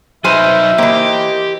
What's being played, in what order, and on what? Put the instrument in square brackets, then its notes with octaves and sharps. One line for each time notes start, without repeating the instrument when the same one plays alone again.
[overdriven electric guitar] F#3 D#4 [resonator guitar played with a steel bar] B4 C5 G#5 [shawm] E5 [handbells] F6 G6
[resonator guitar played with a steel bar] E3 A#3 [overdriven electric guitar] G4 [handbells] C5 D#5 C6